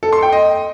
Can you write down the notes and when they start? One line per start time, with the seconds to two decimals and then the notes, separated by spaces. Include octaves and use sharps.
0.03 A4
0.13 C6
0.23 G5
0.32 D#5